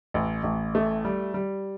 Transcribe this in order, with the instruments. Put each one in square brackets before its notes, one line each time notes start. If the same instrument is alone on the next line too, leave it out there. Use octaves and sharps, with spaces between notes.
[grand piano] A1
A1
A3
G3
G3